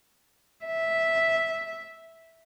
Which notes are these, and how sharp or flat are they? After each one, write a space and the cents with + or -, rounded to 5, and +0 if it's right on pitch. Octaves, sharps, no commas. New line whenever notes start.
E5 -5